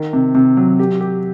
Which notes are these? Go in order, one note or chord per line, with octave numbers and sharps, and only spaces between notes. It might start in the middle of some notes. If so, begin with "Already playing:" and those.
Already playing: D#3
C3
C3
F#3
G4
G4